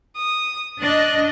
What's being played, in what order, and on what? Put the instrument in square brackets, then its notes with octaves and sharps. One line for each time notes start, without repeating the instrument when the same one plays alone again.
[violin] D#6
[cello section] D4 D#5 [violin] F#6